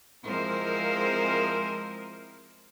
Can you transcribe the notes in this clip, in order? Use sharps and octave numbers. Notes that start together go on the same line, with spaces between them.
F3 G#3 C4 E4 A#4 C5